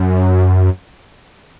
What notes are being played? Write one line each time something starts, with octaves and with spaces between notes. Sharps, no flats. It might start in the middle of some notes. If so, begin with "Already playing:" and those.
Already playing: F#2